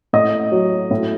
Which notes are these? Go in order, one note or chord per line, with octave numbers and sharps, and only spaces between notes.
A2 D#5
F#3
A2